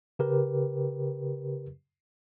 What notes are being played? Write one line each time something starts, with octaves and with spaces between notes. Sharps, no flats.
C#3 G4 A#4 B4